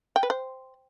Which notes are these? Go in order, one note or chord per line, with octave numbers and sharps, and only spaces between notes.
G5
B4
C5